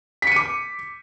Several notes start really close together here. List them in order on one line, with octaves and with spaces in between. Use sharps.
B6 C#7 D#7 D6